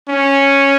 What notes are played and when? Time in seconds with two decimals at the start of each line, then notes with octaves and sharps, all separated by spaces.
0.09 C#4